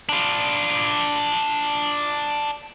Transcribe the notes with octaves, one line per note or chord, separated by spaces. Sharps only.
D4 F4